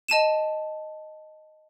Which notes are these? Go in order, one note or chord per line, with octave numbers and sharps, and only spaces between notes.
D#5 A5 D#7 E7